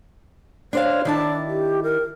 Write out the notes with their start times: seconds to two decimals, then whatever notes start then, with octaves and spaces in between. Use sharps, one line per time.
0.73 D4 C5 C#5 F5
1.05 D#3 D4 E4 A5
1.47 G4
1.83 A#4